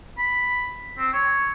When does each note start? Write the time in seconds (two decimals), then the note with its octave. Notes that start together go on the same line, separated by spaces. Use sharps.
0.18 B5
0.98 C4
1.13 C#5